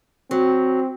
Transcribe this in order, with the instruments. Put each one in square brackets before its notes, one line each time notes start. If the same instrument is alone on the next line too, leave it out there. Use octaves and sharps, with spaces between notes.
[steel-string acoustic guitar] F#3 [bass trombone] C4